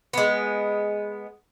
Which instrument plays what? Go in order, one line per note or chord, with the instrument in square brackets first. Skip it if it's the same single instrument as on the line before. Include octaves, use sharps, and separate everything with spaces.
[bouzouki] G#3 B3